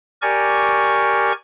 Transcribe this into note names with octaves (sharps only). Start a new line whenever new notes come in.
G4 A#4 D5 G#5 C#6